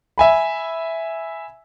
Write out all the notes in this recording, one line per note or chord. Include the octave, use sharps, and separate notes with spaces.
E5 G#5 B5